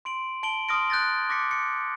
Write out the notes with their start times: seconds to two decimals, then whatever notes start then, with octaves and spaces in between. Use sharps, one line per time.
0.05 C6 D7 F#7
0.43 A5 D7 F#7 G7
0.69 C6 D#6 F6 A#6 D7
0.90 F#6 G6 A6 A#6
1.30 D6 A#6 B6 C#7
1.51 C#7